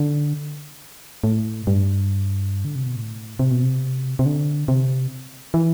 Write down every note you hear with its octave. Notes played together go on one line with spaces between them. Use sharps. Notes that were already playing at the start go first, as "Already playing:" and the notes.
Already playing: D3
A2
G2
D3
C3
B2
A2
C3
B2
C3
C3
D3
C3
E3